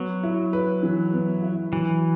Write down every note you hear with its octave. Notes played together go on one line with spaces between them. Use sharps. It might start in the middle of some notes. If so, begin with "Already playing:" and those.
Already playing: F#3 B3
E4
B4
E3
B3
E4
E3 F#3